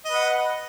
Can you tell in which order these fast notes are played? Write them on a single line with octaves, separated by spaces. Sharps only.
D#5 B4 F#5